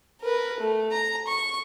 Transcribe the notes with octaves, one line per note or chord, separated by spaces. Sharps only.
A#4 B4
A3
A#5
C#6